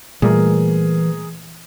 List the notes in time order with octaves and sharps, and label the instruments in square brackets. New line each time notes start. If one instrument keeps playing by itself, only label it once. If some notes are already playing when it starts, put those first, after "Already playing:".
[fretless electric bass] A#2 G3 A3 [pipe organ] E3 [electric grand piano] G#4 A#4